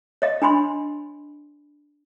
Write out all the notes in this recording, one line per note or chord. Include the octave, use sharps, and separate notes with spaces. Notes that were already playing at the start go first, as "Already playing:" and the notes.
C#5 D#5 F5
D4 G#5 B5 C6